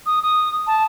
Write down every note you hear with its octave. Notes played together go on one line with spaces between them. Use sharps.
D#6
D#6
A5